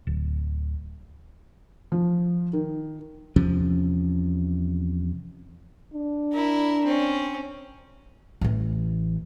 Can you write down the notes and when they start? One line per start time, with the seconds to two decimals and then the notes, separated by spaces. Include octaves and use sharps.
0.07 D1
1.92 F3
2.53 D#3
3.36 E2 C3 F3 C#4
5.94 D4
6.33 E4 A#4
6.85 C4 C#4
8.41 A1 E3